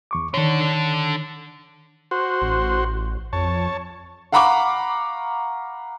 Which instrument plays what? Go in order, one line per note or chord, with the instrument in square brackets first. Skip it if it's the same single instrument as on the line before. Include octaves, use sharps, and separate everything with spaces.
[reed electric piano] E2 C#6 D6
[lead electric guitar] D3 D4 [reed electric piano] D#3 C#5
[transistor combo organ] F#4 C5
[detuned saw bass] A1
[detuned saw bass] F2 [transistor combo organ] C#5 A5
[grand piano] F5 F#5 A#5 B5 C#6 D6